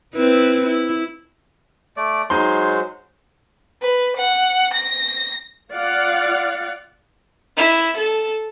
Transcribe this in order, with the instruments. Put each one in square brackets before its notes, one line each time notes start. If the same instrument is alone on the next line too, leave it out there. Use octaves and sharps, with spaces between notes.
[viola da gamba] C4 E4 B4
E4
[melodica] A3 D5
[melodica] F#3 G#3 C5 [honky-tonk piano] D#4 C6
[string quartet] B4
F#5
A#6
[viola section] F4 D5 F5 F#5
[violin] E4
A4